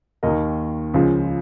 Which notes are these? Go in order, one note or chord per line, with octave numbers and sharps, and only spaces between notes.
D#2 D#3 A#4 D#5
C#2 C#3 F3